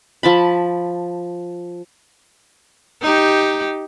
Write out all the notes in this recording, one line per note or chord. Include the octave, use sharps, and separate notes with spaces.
F3 A5 B5
D#4 G4